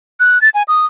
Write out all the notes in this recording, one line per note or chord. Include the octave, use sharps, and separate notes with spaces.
F#6
A6
G#5
D#6